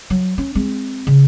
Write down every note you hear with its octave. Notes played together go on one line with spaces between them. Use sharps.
F#3
C#4
G#3 C4
C#3